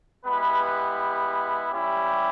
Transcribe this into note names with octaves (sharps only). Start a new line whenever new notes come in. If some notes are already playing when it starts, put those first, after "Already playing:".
G#3 B3 E4 G4 B4 B5
G3 C#4 E4 G4